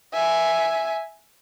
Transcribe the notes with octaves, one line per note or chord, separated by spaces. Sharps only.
E5 G#5